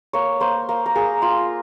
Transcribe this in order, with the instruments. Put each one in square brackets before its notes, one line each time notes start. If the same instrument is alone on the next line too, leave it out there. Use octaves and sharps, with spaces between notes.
[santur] A#3 C#5
A#3 C5
A#3
A#4
A#3 G#4
F4